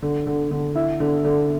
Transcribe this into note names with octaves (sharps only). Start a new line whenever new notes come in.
D3
D3
D3
E4
D3
D3